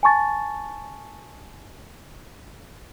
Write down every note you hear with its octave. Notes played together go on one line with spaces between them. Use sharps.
G#5 A5 C#6 A6